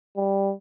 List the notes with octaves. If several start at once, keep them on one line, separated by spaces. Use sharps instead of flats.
G3